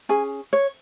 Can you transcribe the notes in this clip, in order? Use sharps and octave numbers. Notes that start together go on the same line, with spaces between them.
C#4 G#4 G#5
C#5